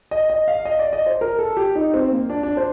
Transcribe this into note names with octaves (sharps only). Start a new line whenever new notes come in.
D#5
D#5
F5
D#5
D5
D#5
C5
A#4
A4
G4
D#4
C4
A#3
D4
D4
C5